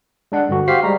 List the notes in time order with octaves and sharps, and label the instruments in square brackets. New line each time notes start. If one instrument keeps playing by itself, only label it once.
[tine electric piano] G#3 D4 F#5
G2 D3 F#4
[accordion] F#4 G4 F5 [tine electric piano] C5 B6 C7
[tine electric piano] G3 G#3 [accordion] A#5